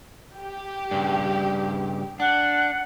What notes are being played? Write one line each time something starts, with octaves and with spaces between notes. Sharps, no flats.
G4
G2 C#3
D4 F#5